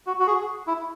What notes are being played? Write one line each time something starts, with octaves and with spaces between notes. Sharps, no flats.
F#4
F#4
G#4
E4